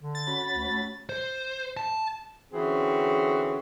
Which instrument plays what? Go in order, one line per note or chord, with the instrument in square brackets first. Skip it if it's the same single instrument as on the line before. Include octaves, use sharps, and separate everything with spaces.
[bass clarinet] D3
[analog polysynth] A6
[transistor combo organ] C#4 F#4 B5
[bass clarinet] D2
A3
[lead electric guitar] C5
A5
[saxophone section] D3 E3 C4 C#4 F#4 G#4